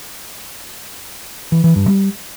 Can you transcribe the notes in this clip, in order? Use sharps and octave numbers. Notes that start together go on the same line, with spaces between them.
E3
E3
G2
G3